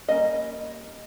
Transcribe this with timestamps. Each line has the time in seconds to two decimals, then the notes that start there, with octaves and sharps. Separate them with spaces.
0.08 G3 A#3 C#4 D#5